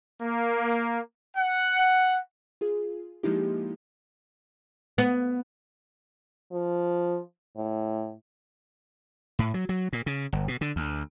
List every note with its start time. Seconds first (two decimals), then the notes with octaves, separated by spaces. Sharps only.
0.21 A#3
1.37 F#5
2.61 F4 G#4
3.23 F3 G#3 A#3 D#4 E4 G4
4.98 B3
6.52 F3
7.56 A2
9.39 A2
9.54 F#3
9.69 F#3
9.93 A#2
10.06 C#3
10.33 G1
10.48 B2
10.61 D3
10.76 D2